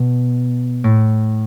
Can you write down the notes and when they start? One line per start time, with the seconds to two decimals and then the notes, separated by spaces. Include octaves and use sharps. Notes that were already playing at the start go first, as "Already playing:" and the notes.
Already playing: B2
0.84 A2